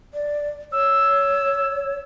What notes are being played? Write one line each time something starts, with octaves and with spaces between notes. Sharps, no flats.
D5
C#5 E6